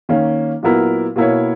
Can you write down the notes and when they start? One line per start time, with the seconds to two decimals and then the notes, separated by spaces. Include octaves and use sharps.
0.09 D#3 A#3 C#4
0.63 A#2 F#3 B3 E4 A#4
1.16 B2 A#3 E4 A#4 C#5